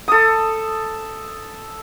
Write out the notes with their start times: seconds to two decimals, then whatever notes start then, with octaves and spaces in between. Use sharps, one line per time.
0.08 A4 D#6